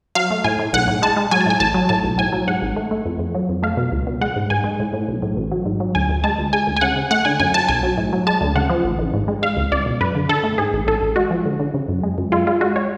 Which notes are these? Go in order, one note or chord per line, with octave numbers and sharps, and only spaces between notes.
F#3 F5
A3
A2 G#5
A2
B1 F#5
A2
G#3 A5
G#3
F#3 G#5
A5
A2 G#5
A1 A5
F#3
A2 A5
B1
A2 G#5
F#3
G#2 F#5
G#1
A3
A3
F2
F2
F#3
F2
A3 F5
B2
C#2
B2
G#3 F#5
G#2
G#2 G#5
G#3
A2
A2
B1
A2
A1
F#3
G#2
F#3
D2 G#5
D2
G#3 A5
D2
G#3 G#5
D2
G#5
C#3 F#5
C#3
A3 F#5
D3 G#5
F#2 G#5
F#2 A5
B1 G#5
F#3
A2
F#3
G#3 A5
D2
C#3 F#5
F3
A1
A1
G#2
G#3
G#3 F5
C#2
C#2 D5
B2
F#2 B4
D3
D3 A4
A3
G#2 G#4
A1
A1 A4
A1
G#3 F#4
F3
D3
D3
C#3
F#2
G#3
F#2
G#3 F4
G#3 F4
G#3 F#4
G#3 C#5